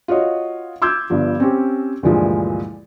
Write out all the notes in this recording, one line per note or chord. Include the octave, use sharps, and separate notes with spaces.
F4 F#4 C#5 D#5
C6 D6 E6 G6 G#6
G1 G2 F3
C4 C#4 G4
D2 G2 A#2 E3 F3 G#3